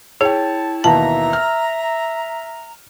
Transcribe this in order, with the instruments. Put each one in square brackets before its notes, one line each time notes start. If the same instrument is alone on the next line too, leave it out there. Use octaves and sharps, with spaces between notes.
[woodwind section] E4 A5 [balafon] G#4 [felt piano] C#5 G5
[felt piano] D#2 B2 E3 [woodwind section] E5 A#5 [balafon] A5
[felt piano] F6